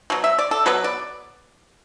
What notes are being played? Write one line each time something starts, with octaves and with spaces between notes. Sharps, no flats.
B2 F#3
E5
D5
A4
B2 F#3 B3 B4
D5